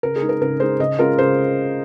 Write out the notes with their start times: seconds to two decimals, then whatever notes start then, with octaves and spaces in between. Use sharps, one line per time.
0.03 C#3 A#4
0.16 G#4
0.22 G#3 D#4
0.29 A#4
0.41 C#3 A#4
0.60 G#3 D#4 C5
0.80 C#3 D#5
0.99 G#3 C#4 F4 A#4
1.19 C#3 C5